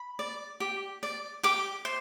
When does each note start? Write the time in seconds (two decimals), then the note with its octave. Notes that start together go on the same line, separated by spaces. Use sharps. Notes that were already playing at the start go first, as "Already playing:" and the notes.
Already playing: B5
0.19 D5
0.60 G4
1.03 D5
1.43 G4 D6
1.85 C5